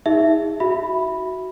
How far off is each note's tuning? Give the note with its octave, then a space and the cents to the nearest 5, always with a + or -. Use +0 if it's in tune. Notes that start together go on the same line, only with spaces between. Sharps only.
D#4 +45 G#4 -30 E5 +5
F#4 +5 E5 +0 B5 +0